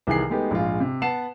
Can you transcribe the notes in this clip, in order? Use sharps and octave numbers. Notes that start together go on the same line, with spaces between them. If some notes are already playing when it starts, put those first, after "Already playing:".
C2 D#3 E3 G#4 C7
G#3 A3 B3 D#4 G4
A#1 G#2 F4
C3
B3 F#5 A5 C7 E7